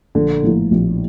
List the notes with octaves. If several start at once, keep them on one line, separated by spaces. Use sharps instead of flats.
A#1 D3
A2 F3 A#3 E4
A#1